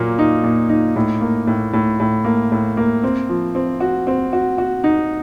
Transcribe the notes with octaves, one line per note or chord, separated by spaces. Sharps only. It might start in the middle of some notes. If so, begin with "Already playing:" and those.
Already playing: A#2 F#3 A#3
D#4
A#2
D#4
A2
A#3
A2
A2
A2
A#3
A2
A#3
C4
F3
C4
F#4
C4
F#4
F#4
D#4